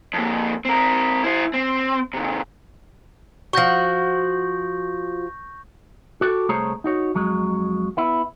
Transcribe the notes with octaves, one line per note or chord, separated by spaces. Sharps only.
F2 A#3
C4 A#4
E4 C5
C4
C3 D#3
F3 F#4 C#6 G6 A#6
F#4 G4 A4
C2 A3 G#4 C5 C#5 A#5
D#4 F#4 C#5
F2 F#3 G#3
B3 E4